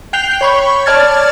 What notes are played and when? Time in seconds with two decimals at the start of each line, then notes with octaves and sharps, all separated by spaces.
0.13 G5 F#6 G6 C7 F7 G7
0.41 C#5 B5 C#6
0.86 C#5 D5 A5 F6 G#6 A6